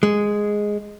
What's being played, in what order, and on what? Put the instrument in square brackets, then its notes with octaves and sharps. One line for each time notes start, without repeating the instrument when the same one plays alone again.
[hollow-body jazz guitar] G#3